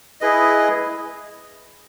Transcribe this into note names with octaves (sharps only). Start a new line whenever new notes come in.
E4 G#4 B4 D#5